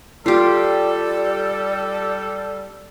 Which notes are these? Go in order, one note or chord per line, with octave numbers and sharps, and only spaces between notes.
G3 F4 G4 A4 D5